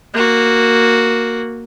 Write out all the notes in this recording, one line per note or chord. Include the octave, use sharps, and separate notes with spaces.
A#3 F#4